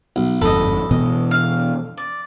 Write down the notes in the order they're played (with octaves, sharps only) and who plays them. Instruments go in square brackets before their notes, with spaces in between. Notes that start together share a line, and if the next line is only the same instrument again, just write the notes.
[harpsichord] B1
[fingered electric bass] G1 F2 G#2 [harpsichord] A4 [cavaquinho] D#5 B5
[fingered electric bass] B2 E3 B3 [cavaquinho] D#5
[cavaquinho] F5
D5